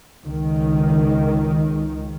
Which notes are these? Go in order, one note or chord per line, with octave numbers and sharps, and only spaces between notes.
C#2 D#3